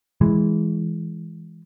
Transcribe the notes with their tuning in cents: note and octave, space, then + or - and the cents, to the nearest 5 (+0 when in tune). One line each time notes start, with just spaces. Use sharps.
E3 +0 G#3 +0